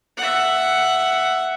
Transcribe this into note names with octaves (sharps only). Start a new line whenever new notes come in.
E5 F#5